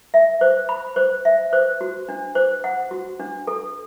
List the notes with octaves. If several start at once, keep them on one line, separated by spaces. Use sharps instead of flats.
E5
C5
B5
C5
E5
C5
F#4
D4
C5
F#5
F#4
D4
A4